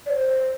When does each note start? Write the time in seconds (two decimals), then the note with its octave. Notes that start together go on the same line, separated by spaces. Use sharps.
0.06 D5
0.10 C5